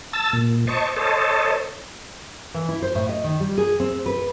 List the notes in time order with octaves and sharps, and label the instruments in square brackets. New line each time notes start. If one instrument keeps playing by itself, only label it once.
[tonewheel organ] A5 E6 A6
A#2
C5 D#5 A5 C#6
A4 C5 C#5 D#5 A5
[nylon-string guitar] E3
E4
C5
A2
D#5
D#3
G3
G#4
C4
B4